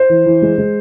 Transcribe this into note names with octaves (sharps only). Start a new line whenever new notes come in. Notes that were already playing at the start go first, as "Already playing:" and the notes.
Already playing: C5
E3
E3
G#3
G#3